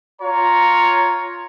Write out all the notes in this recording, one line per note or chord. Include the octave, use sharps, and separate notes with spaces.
F4 C#5 A#5